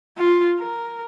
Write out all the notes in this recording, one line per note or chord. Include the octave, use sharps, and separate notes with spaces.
F4
A#4